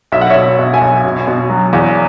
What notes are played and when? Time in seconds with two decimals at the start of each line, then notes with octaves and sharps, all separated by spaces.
0.12 B1 E5
0.21 F#5
0.30 C#5 E5
0.36 B2
0.59 B2
0.74 E5 G#5
0.81 B1
1.04 B2
1.28 B2
1.50 F#3
1.73 E2